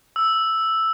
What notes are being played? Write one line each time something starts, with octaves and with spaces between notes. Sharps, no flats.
E6